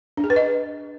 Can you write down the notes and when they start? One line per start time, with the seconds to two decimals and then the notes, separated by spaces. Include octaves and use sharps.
0.17 D4
0.24 G#4
0.30 B4
0.36 D#5